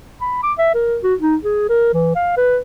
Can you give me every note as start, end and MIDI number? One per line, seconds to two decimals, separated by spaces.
0.21 0.38 83
0.43 0.52 86
0.58 0.73 76
0.74 0.97 70
1.03 1.14 66
1.20 1.36 63
1.44 1.67 68
1.69 1.92 70
1.94 2.15 52
2.15 2.34 77
2.37 2.59 71